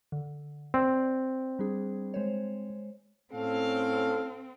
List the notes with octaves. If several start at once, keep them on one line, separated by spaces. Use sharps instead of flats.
D3
C4 D5
G3 D4 G#4
G#3 C5 C#5
A2 C4 C#4 A4 F5